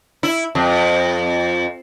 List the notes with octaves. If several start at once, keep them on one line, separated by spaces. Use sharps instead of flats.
E4
F2